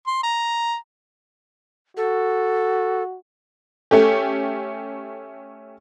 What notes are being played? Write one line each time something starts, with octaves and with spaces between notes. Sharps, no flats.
C6
A#5
F#4 A4
A3 C#4 G4 A4